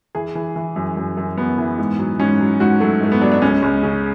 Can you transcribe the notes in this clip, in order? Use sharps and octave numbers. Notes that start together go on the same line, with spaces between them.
E3 G#4
E3
E3
F#2
F#2
F#2
F#2 B3
E3
G#2
F#3
G#2 C#4
F#3
G#2 F#4
F#3 A3
G#2 A3
B3
F#3 D4
D4
C#2 C#4
C#2
C#3